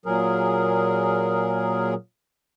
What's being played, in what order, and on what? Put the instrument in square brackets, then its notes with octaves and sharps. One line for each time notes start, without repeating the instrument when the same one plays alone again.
[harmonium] A#2 F#3 G#4 A#4